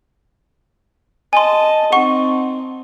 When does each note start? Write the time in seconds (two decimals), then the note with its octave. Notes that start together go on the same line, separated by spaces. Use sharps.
1.33 D#5 G#5 A5 C6
1.92 C4 D#4 F#5 C#6